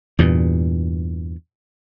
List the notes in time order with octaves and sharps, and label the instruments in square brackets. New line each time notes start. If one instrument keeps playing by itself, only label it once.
[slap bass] E2 G2 A#2